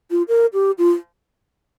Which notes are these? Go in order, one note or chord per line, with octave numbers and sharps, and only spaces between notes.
F4
A#4
G4
F4